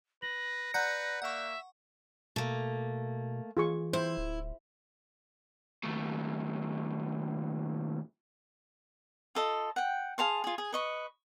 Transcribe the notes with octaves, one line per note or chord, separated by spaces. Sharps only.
B4 A#6 F#7
B4 D5 F#5 A#5 F#6 G6 C#7
A#3 E5 F#5 C#6
B2 A3 A#3
E3 F4 G#4 C#6
E4 C5
D1
D#2 A2
F4 A4 D#5
F#5 G5
G#4 F5 A5 C6
F4 G#4
G#4
B4 D#5 C#6